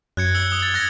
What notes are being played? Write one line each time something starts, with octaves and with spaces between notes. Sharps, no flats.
F#2 F#6 G#6 C#7
E6 C#7 G7
D#6 G7
A6
F#6 G#6 A#6